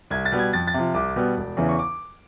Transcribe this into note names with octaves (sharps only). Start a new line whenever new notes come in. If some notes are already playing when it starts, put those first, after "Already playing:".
C2 G#6
A6
B2 G3 B3
G#6
F2 A6
A6
C3 F3
C2 D6
B2 G3 B3
E1
E2 C#3 E3
C#6
D6